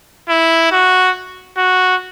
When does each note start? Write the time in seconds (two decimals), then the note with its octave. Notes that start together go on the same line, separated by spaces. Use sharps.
0.29 E4
0.72 F#4
1.57 F#4